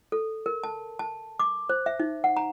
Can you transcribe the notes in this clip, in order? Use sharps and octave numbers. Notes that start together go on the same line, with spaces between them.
A4
A#4
A5
A5
D6
C5
E5
D#4
F#5
A#5